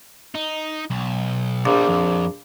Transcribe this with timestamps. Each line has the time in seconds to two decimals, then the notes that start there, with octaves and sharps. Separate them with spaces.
0.35 D#4
0.90 B1
1.65 A#1 B2 G3
1.89 F2